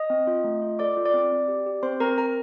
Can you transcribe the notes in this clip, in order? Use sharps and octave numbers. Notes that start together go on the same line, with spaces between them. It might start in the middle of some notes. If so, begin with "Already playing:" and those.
Already playing: D#5 D#6
C4
F4
A3
F4
A4 D5 D6
F4
D5 D6
C4
C4
G4
G4
C4 C5 C6
C4 A#4 A#5
C4 A#4 A#5